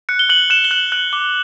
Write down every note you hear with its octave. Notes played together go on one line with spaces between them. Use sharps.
F#6 C#7
G7
F#6 F#7
F#6 E7
G7
F#6 F#7
F#6 F#7
D6 G7